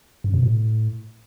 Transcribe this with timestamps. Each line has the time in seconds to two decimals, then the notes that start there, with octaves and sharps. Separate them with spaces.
0.24 F#2
0.34 B2
0.43 A2